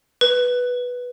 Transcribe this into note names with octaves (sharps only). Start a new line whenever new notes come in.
B4